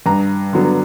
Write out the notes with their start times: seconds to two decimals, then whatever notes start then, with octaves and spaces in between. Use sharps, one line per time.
0.06 G2 A#5
0.53 D3 F#3 B3